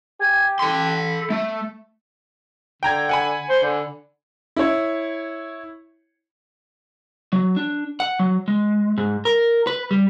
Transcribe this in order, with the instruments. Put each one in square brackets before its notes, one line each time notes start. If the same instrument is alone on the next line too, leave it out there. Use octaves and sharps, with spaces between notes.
[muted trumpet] G4 [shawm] G#5
[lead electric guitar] A4 C6 [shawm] B5
[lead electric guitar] A3 [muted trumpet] E5
[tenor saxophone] D3 [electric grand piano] G5 A#5 G#6
[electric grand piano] F#5 G#5 B5
[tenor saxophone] C5
D3
[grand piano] E4 C#5
[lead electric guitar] F#3
D4
F#5
F#3
G#3
G#2
A#4
B4
G3